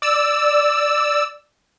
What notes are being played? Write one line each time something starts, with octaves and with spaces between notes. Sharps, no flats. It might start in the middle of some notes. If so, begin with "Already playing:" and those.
D5 E6